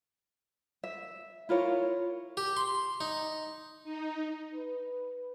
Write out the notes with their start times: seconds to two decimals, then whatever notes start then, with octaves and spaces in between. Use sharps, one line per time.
0.84 E5
1.49 E4 F4 A#4 C#5
2.37 G4
2.57 C6
3.01 D#4
3.84 D#4
4.54 B4